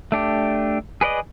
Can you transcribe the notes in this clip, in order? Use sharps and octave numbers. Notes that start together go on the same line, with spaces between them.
A3 D4 G4
G#4 B4 D5 D#5